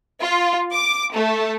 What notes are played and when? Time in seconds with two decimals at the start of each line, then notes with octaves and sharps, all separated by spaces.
0.21 F4
0.73 D6
1.14 A3